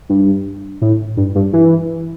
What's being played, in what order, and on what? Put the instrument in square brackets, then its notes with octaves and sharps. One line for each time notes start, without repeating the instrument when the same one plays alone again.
[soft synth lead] G2
A2
G2
G2
E3